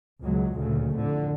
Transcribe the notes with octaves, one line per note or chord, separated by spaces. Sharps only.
C#2 B2 F#3 G#3
D2 A#2 C#3 A3
F2 A2 D3